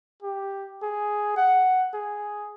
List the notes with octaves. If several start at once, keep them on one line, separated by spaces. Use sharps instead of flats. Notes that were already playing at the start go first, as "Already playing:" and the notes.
G4
G#4
F#5
G#4